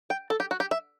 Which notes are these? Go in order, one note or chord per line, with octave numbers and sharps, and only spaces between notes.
G5
A4
G4
F#4
G4
E5